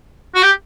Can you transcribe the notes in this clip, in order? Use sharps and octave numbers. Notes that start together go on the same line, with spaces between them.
F#4
G4